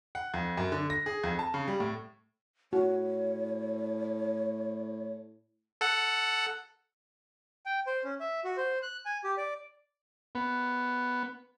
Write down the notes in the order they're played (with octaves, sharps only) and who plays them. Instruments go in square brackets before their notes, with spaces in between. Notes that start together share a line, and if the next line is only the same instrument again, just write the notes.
[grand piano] F#5
F2
F#2
D3
A#6
G#4
F2
A5
C#3
G3
A2
[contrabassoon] A2 [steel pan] F#4 [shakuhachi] C#5
[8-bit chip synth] A4 F#5
[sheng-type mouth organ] G5
C5
C#4
E5
F#4
C5
F#6
G#5
G4
D5
[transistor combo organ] B3